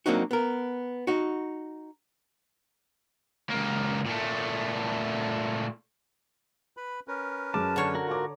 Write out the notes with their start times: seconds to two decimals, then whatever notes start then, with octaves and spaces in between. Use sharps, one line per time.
0.06 F#3 A#3 C4 D4 D#4 F#4
0.31 B3 A#4
1.07 D#4 F#4
3.50 C#2 A#3
4.06 A#2 A3
6.77 B4 B5
7.08 C#4 A#4 B4
7.54 F#2 G#4 A5 D6
7.76 D3 C#5
7.95 F#4 A#4
8.07 G#2 F4 A#5 D6